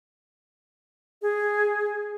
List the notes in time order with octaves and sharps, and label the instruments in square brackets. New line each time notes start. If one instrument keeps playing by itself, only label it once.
[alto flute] G#4